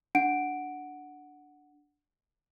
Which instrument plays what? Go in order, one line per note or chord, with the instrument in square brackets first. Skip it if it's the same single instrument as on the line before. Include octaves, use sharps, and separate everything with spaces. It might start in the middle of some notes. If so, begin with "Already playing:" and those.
[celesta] D4 F#5 D7